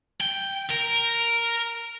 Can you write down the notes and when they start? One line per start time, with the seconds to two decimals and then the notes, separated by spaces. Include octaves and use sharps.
0.20 G5
0.70 A#4